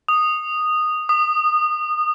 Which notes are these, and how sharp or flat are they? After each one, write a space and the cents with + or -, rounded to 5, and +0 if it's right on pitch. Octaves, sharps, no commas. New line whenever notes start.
D#6 -10
D#6 -25